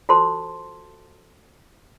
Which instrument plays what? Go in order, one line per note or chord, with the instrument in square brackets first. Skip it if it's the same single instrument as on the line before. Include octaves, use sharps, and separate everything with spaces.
[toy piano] F4 F#4 A4 C5 A5 C6